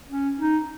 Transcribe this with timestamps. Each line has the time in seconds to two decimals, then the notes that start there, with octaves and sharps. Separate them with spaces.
0.09 C#4
0.38 D#4